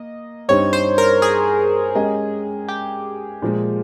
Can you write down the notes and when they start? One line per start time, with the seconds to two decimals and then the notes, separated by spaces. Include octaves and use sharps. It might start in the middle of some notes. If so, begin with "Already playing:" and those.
Already playing: A#3 D#5
0.49 G2 G3 C4 D#4 C#5
0.73 C5
0.98 A#4
1.22 G#4
1.95 G#3 C#4 G4 A#4 D#5
2.68 G4
3.42 A#2 F3 G#3